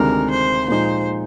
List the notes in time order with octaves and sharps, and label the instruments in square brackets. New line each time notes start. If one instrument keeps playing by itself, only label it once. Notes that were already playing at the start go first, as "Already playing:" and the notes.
Already playing: [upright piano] D2 C3 D#3 G#3 D4 [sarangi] A#4
[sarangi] C5
[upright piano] A#2 F3 G#3 D#4 [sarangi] C5